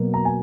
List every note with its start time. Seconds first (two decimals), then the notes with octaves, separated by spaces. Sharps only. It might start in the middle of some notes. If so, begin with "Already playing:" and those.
Already playing: B2 F#3 A#3
0.14 A#5
0.25 G#5